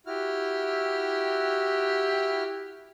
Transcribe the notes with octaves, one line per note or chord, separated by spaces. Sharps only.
E4 F#4 G4 F6